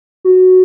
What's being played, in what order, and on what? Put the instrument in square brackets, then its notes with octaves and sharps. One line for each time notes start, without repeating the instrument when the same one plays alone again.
[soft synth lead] F#4